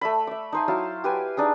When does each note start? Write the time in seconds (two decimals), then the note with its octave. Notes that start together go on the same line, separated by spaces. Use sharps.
0.01 A3 E5 B5
0.27 E5 D6
0.52 D#4 C5 G#5
0.68 F#3 E4 F5 A5
1.04 G4 B4 G#5
1.37 D4 D#4 G#4